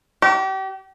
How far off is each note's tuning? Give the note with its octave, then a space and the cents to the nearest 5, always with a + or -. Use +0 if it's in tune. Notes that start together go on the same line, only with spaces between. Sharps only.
G4 -35